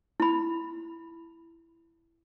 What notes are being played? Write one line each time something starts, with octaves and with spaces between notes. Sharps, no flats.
E4 B5